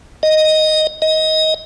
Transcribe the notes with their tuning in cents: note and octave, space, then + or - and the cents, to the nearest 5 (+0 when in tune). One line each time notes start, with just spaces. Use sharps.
D#5 +0
D#5 +20